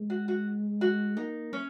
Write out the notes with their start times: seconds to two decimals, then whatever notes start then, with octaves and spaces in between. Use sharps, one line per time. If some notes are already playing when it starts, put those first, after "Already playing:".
Already playing: G#3
0.10 F#4
0.28 F#4
0.81 F#4
1.17 A#3 D#4
1.53 C#4